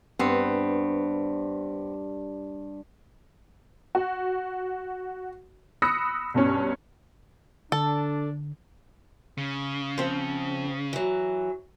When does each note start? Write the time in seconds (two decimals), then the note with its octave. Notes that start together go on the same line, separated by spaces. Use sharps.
0.19 G2 B3 C4
3.95 F#4
5.82 B5 D#6 E6 F#6 A#6 C#7
6.34 B1 G2 C#4
7.72 D3 D4 A4
9.37 C#3
9.98 F3 C4
10.93 E3 F#3